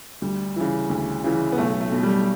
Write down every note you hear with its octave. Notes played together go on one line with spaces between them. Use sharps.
D2 G3
C#3 E3
D2
C#3 E3
B3
B1 A3
A3
B2
G3